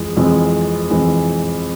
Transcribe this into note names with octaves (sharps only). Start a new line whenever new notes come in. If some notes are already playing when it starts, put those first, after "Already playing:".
Already playing: F2 E3 G#3
F2 E3 G#3
F2 E3 G#3